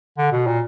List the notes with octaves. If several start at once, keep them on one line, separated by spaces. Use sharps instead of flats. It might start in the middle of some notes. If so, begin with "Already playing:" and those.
D3
B2
A#2